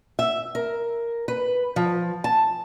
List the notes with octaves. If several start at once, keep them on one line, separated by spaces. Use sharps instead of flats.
E5
A#4
B4
F3
A5